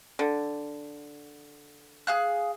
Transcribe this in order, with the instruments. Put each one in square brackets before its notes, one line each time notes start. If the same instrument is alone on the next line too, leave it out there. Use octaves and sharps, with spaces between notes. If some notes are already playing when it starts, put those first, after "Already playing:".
[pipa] D3
[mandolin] G#4 F5 F#6